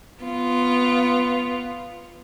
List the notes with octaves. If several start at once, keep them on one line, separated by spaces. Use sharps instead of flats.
B3 F4